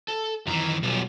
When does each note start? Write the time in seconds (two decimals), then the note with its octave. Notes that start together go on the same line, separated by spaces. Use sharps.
0.08 A4
0.47 F#2 D#3 E3 A#5
0.83 B1 G3 F4